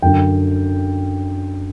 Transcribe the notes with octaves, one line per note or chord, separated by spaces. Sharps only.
F#2 D3 G5